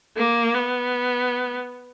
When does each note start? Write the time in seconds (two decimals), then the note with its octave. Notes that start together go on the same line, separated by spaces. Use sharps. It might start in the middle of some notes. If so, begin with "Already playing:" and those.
0.17 A#3
0.54 B3